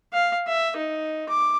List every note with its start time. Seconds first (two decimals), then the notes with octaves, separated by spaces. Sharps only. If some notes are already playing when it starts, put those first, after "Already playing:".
0.13 F5
0.47 E5
0.77 D#4
1.29 D6